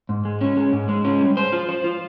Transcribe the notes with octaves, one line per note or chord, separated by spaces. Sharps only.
G#2
G#3
C#4
G#3
G#2
G#3
C#4
G3
C5
F4
C5
F4